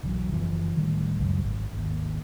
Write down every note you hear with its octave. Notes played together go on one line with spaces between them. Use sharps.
E1 B1 E3 F#3
F#1 E3 F3
D1 D2 D#3 G3
C#2 F#2
G#1
G#1 D#2